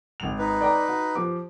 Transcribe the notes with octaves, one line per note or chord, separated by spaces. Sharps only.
G#1 F7
D#4 B4
D5 G5 A#5
F#4
F3 G4 D6